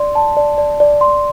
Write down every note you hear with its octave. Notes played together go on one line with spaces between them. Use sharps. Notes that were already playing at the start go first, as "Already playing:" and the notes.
Already playing: D5 C6
A5
D5
D5
D5
C6